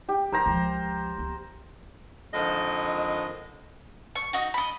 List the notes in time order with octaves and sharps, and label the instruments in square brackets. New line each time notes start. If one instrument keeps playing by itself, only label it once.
[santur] G4
[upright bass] F#3 G3 [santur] A#4 C5 A#5
[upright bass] C#2 F3
B3
[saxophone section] F2 D3 D#3 F3 G#3 D#5
[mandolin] C#6
D#4 F#4
D#5 B5